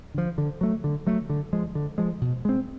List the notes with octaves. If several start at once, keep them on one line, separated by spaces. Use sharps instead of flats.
D3 F3
D3
F#3 A3
D3
F#3 A3
D3
F3 G#3
D3
F3 G#3
B2
G#3 C4